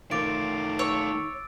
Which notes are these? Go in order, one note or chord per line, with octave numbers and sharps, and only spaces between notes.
D#3 A3 F4 D6 A6 D7
C#5 E6